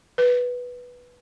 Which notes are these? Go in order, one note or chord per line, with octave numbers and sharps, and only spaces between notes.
B4